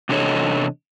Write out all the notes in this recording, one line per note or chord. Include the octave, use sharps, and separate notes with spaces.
E2 C3 D4 A4 C#5 D#5